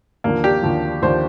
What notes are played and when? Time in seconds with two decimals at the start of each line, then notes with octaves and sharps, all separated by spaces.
0.24 D#2 D3 F3 A#3
0.44 G4
0.63 D#2 D3 F3
1.02 D#2 D3 F3 C5